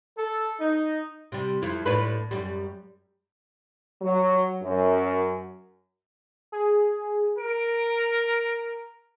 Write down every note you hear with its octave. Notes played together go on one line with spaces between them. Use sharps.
A4
D#4
C3 G3
F2 E4
A2 D4 B4
F#2 G3
F#3
F#2
G#4
A#4 D7